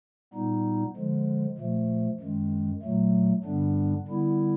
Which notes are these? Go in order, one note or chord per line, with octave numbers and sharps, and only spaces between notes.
A#2 G3 B3 D#4
D3 F3 G#3
A#2 F3 A3
F#2 D#3 G#3
A#2 F#3 A3
G2 D3 G3 B3 D4
D3 G3 B3 E4